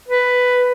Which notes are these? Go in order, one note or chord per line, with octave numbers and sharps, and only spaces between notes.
B4